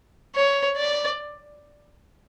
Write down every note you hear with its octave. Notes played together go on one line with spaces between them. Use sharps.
C#5
D5